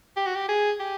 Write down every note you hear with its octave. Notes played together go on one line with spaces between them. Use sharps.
G4
F#4
G4
G#4
G4